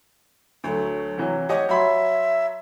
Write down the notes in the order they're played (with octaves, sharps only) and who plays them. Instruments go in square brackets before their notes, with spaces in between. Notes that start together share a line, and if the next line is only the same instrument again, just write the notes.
[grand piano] D2 A3 [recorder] F#3
[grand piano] C3 E3 F#3
[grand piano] G4 D#5 F#5 [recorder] C#5
[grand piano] F#3 B5 C6 [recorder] E5